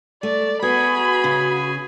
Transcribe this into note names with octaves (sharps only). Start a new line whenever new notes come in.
A3 D5
B3 F#4 G#4 G#5 B5
C#3